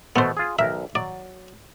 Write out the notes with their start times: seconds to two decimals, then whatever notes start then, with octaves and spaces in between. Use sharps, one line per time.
0.16 B2 A3 B3 C5
0.37 F4 G#4
0.59 B1 A#4 E5
0.95 F#3 D5